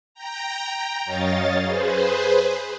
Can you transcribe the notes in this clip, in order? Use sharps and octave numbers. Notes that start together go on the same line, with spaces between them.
G5 A#5
F#2 C#5 D#5 F5 A6
G#4 B4 C5